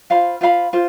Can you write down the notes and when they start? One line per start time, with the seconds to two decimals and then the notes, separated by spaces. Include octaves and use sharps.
0.10 F4 C5 F5 B5
0.41 F4 C5 F5 B5
0.73 F4 C5